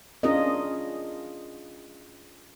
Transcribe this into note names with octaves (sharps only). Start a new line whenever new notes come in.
C#4 D4 F4 G#4 A#4 D#5